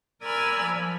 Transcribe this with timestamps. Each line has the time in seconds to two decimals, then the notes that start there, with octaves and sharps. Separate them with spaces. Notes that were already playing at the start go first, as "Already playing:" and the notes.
0.22 A#4 D5 G#5 B5 E6 F6
0.63 F3